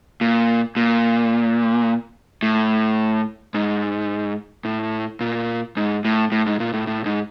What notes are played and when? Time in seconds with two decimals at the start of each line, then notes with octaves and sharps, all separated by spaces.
0.21 A#2
0.76 A#2
2.43 A2
3.54 G#2
4.65 A2
5.20 A#2
5.77 G#2
6.05 A2
6.32 A2
6.46 G#2
6.60 A#2
6.73 A2
6.87 A2
7.06 G#2